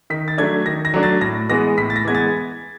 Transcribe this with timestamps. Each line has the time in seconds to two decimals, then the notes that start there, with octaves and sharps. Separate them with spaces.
0.10 D#3 B6
0.28 A6
0.38 F#3 A3 D4 G#6
0.66 D#3 A#6
0.85 A#6
0.94 F#3 A3 D4
1.03 A6
1.21 A2 A#6
1.49 E3 G#3 B3 A#6
1.78 A2 B6
1.90 A6
1.96 A#6
2.05 E3 G#3 B3 G#6
2.15 A6